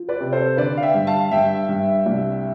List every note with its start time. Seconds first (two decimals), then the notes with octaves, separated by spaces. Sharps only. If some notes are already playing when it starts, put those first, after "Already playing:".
Already playing: F3
0.09 B4 D5
0.20 C3
0.32 A4 C5
0.57 D3 B4 D5
0.77 F5
0.83 E5 G5
0.94 G2
1.07 F5 A5
1.31 G2 E5 G5
1.69 G2
2.06 C2